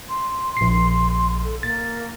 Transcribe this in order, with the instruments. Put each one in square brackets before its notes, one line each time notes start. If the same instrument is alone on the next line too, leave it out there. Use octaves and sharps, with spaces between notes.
[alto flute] C6
[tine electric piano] A#1 C7
[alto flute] A4
[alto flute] A#3 [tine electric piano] A6